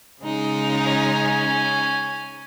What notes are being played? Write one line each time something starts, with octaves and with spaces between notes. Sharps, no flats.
C#3 G#3 D#4
C#4 G#5